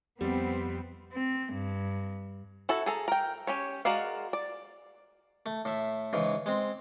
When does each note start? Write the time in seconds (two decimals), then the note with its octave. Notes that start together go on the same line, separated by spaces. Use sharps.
0.21 F2 G3 B3 C4
1.13 C4
1.53 G2
2.69 E4 F#4 A4 A5
2.86 G#4 A4 A#5
3.08 A#4 G5
3.47 C#4 G4 C#5
3.85 G#3 F#4 A#4 D5 F5
4.33 D5
5.46 A3
5.65 A2 E5
6.13 G#2 C#3 E3
6.46 G#3 C4